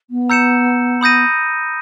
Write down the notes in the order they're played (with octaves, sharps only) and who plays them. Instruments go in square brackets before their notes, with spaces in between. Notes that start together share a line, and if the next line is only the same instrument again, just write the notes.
[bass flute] B3
[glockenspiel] A#5 E6 G6 C#7 E7
B5 D#6 G6 A#6 D#7